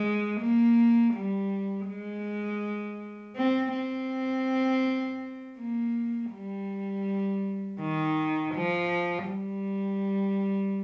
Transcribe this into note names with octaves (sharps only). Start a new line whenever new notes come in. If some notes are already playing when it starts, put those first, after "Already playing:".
Already playing: G#3
A#3
G3
G#3
C4
C4
A#3
G3
D#3
F3
G3